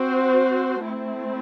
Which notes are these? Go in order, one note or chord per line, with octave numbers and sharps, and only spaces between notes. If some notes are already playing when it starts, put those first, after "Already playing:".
Already playing: C4 F#4 C5
A3 C4 E4